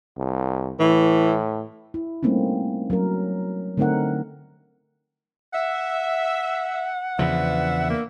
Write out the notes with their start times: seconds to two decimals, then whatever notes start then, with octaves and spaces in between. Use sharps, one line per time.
0.17 C2
0.80 A2 E3
1.94 E4
2.23 G3 A3 A#3 C4 C#4 D#4
2.90 F#3 C#4 A#4
3.77 D3 A3 C4 D#4 A#4 F#5
5.53 E5 F#5
7.19 E2 C#3 F3 D4 B4 E5
7.90 A#3